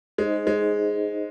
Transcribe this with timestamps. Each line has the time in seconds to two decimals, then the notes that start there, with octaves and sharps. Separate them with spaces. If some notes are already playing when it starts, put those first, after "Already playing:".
0.18 G#3 D#4 G#4 C5 D#5
0.47 G#3